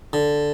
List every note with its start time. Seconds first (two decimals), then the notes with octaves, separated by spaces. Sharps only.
0.13 D3